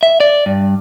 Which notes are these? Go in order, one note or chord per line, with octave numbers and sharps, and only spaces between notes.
E5
D5
G2